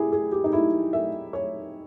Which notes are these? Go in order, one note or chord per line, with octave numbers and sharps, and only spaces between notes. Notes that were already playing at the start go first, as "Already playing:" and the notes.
Already playing: E4 G4 G#4
G#4
G4
D#4
E4
E5
C#5